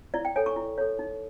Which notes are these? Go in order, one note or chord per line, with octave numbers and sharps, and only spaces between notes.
E4 D5
G5
A4 C#5 G#5
C#6
E4
A4 C#5
D#4